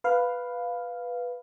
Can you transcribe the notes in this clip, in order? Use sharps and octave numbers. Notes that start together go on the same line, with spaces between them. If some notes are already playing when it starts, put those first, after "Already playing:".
B4 F5